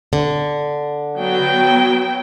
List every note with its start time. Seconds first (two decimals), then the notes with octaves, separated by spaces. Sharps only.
0.13 D3
1.18 F#3 B3 G5